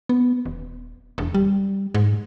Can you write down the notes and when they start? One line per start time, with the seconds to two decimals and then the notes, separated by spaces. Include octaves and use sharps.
0.09 B3
0.46 D#1
1.18 E1
1.34 G3
1.95 G#2